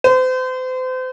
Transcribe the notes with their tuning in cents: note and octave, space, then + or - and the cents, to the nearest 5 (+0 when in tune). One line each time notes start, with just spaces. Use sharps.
C5 -35